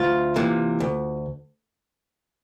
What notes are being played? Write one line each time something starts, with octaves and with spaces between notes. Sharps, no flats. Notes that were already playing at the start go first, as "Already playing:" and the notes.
Already playing: D2 F4
C3 E3 A#3
D2